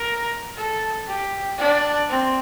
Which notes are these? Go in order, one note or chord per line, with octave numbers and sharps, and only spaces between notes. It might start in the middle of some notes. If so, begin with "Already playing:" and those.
Already playing: A#4
A4
G4
D4
C4